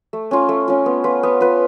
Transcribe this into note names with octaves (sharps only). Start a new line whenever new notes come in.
A3
C#4 F4
A3
C#4 F4
B3
F4 B4
B3
F4 B4